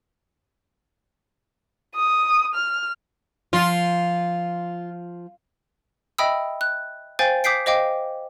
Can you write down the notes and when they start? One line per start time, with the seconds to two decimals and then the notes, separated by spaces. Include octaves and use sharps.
1.95 D#6
2.55 F6
3.53 F3 F4
6.18 D#5 E5 G5 B5 D#6 E6
6.61 F#6
7.19 C5 F5 G5 G#5 G6 A6
7.44 D6 D#6 G6 B6 C7 D7
7.66 C5 D#5 F5 G5 D6